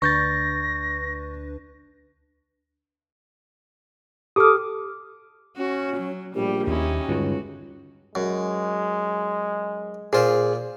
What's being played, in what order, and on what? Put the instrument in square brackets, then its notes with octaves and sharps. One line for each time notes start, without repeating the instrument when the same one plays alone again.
[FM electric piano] D2 D4 B4 [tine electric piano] C#6 G6 A6 [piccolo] A#6
[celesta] G4 F6 [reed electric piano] A4 D6 D#6
[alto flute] C#4 [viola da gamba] F#4
[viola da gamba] F#3
[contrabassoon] A#1 [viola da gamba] A2 G3 [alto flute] G4
[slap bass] D#2 [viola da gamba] C#4 D#4 E4
[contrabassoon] C#2 [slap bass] G2 D3 D#3 [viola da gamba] F#4
[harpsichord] F#2 [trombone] G#3
[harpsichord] A#2 F4 [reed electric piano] G#4 C5